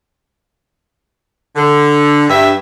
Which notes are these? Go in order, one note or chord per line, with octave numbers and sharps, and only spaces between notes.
D3
G2 E5